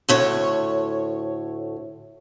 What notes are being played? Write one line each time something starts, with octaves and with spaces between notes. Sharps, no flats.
D2 A2 C#5